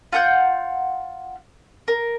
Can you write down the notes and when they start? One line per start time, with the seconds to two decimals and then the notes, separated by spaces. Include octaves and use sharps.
0.13 F4 F#5 G6
1.88 A#4